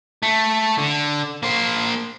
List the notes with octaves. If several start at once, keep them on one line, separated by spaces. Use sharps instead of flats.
A3
D3
A#3 C5